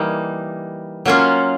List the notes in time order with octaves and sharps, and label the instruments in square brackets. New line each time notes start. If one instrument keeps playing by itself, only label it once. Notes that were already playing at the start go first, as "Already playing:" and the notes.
Already playing: [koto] E3 G3 A#3 D#4
F#3 A#3 C#4 F4